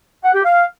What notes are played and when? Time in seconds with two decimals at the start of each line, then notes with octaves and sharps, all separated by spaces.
0.24 F#5
0.34 G4
0.44 F5